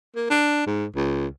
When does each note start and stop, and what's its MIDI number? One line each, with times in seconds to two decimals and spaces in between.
0.16 0.25 58
0.30 0.64 62
0.67 0.86 44
0.96 1.27 37